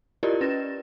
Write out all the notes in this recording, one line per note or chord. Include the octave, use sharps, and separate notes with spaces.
E4 F4 G4 A#4 D5 D#5
C#4 B4 A6 A#6 E7